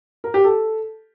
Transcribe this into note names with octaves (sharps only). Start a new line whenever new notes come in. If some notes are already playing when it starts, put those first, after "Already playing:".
A#4
G4
A4